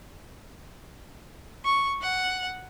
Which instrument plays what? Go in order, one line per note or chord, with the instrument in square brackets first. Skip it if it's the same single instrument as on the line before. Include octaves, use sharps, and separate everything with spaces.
[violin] C#6
F#5